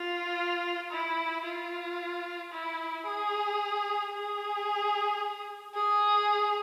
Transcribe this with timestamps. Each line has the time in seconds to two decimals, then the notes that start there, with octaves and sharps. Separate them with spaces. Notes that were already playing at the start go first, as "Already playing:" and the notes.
Already playing: F4
0.91 E4
1.44 F4
2.52 E4
3.06 G#4
4.13 G#4
5.74 G#4